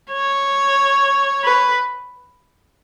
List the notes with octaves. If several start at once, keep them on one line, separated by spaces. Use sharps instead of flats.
C#5
B4